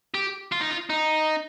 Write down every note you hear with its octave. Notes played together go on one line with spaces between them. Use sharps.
G4
F4
D#4
F4
D#4